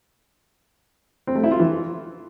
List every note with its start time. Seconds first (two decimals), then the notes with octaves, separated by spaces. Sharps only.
1.27 C4
1.35 A3
1.44 E4
1.52 F4
1.60 E3